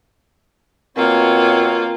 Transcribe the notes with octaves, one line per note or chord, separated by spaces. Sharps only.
B2 A#3 C4 F4 C#5